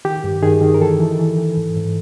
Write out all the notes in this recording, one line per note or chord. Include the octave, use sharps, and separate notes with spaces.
D#3 G4
G2
D#3 G#4
D#3
A#4
E3 A4
E3
E3
E3
G#2
G#2